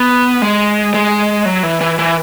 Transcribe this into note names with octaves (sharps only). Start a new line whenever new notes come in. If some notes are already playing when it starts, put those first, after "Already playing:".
Already playing: B3
G#3
G#3
F#3
E3
E3
E3